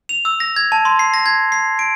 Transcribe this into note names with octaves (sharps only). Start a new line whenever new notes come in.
F7
E6
A#6
G#6
A5
C6
C7
A#6
G#6
C7
D7